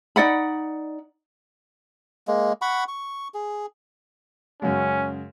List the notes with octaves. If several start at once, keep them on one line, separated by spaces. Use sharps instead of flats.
D#4 D5 F#5 B5
G#3 A#3
F#5 B5 C#6
C#6
G#4
F#2 C#3 G#3 C#4